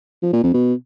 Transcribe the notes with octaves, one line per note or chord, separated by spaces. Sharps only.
F3
A#2
F2
B2